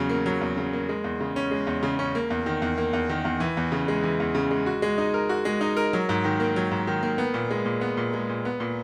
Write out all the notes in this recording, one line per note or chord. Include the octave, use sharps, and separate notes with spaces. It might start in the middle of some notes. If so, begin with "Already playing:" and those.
Already playing: E2 C#3 F#3
A#3
F#3
E2
C#3
A#3
G#3
E2
C#3
C#4
G#3
E2
C#3
C#4
A#3
E2
D#3
E2
A#3
E2
D#3
E2
E3
E2
C#3
G#3
E3
E2
C#3
G#3
F#4
G#3
D#4
A#4
F#4
G#3
D#4
A#4
F#3
G#2
D#3
A#3
F#3
G#2
D#3
A#3
B3
A#2
G#3
A#2
B3
A#2
G#3
A#2
B3
A#2